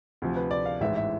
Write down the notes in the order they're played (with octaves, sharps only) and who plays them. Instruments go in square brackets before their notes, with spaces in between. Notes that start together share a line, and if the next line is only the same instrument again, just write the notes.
[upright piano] D2 C3 F3
B4
D5
F5
A1 G#2 E3 E5
E5